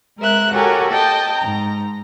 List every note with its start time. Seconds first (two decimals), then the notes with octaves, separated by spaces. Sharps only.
0.19 G#3 A#4 E5 F#6
0.53 F#4 G4 A4 A#4 C#5 G#5
0.91 D#5 G5 A5
1.37 G#2 A#5